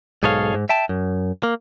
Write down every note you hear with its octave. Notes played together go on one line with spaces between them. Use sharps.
B1 G#2 G#4 A4 C#5 F5
G#2
E5 G5 A5
F#2
A#3